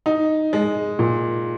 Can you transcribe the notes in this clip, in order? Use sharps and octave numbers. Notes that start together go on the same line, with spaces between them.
D#4
G#3
A#2